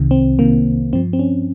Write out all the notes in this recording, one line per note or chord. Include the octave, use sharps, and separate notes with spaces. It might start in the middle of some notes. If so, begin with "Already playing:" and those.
Already playing: C2 C3 D#3
C4
C2 C3 D#3 A#3
G2 F3 C4
C4
C#4